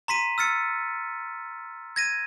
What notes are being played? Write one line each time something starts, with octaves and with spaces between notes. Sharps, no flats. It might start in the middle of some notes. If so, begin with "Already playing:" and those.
A#5 C6 B6 D#7
E6 F6 A6 C#7
G#6 A#6 D#7